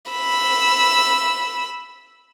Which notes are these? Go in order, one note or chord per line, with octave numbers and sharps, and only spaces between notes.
B5 E6